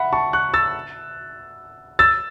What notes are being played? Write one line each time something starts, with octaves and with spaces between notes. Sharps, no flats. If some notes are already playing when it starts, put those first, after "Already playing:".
Already playing: E5 F#5 B5
A5 C#6
C#6 F#6
E6 A6
E6 A6